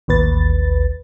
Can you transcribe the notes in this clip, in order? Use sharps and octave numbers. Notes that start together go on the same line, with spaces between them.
A1 D#2 B4 A6